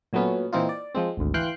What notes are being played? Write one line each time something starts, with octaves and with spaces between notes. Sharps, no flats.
A#2 F#3 A3 B3 C#4
A#2 E3 C4 D#4 F4
D5
F3 G#3 C4
G#1 D2
E3 F5 G5 C6 F#6